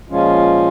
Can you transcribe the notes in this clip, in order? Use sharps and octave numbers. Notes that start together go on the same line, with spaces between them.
A#2 F3 G#3 C#4 F4